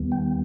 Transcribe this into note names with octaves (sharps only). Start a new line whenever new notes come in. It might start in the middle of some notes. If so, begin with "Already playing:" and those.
Already playing: D#2 D#3 G3 B3
G5